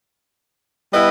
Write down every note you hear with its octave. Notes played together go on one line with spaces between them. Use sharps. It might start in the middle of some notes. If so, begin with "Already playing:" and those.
G3 B3 E4 B4 D#5